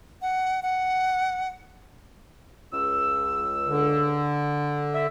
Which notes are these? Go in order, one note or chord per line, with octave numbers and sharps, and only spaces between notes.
F#5
F#5
C#2 E6
D3
E5